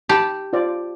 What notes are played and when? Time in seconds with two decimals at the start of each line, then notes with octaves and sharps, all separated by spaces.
0.09 G4 A5 B5
0.53 F4 C5 D5